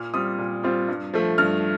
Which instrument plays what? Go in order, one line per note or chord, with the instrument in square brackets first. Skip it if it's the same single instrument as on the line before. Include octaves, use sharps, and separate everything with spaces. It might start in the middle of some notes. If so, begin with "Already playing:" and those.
Already playing: [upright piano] A#2 F6
G3 C4 F4 D#6
A#2
G3 C4 F4
G2
F3 A3
G2 F6